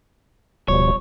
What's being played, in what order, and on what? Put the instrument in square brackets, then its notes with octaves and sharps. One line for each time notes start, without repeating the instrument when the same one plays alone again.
[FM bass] D1 [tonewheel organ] B2 F3 G3 [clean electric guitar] C#5